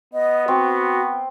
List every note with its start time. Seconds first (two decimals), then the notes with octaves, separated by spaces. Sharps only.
0.14 B3 D#5
0.48 C4 F#4